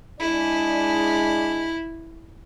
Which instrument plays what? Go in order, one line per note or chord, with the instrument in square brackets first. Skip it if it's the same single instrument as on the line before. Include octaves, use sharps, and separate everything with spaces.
[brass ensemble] G#3 D4 D5 [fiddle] E4